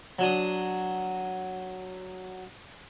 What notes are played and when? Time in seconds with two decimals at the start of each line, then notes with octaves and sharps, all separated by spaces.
0.19 F#3 D4 D#6